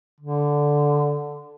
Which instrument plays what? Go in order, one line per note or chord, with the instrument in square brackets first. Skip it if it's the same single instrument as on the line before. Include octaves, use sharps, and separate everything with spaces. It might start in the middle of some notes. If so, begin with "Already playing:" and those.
[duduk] D3